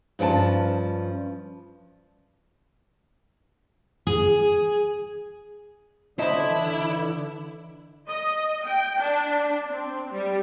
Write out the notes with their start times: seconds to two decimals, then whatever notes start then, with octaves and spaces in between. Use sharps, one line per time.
0.19 G2 F3 C#4 G5 A5
4.07 G#4
6.19 D3 F#3 E4 C5 D#5 A5
6.51 E3
8.08 D#5
8.65 G5
9.00 D4
9.69 C4
10.12 G3